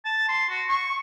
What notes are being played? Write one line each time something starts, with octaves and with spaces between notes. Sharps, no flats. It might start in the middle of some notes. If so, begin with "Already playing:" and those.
A5
C6
F#4
C#6